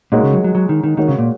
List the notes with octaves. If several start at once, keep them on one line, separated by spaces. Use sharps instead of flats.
A#2 G#3 D#4 F#4 A#4 C#5
C#3
F#3
F#3
F#3
D#3
D#3
D#3 G#3 F#4 A#4 C#5
C#3
A#2